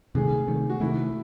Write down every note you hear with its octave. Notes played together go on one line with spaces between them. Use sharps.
C3 D#3 A3 G#4
C3 D#3 A3
F#4
C3 D#3 A3 E4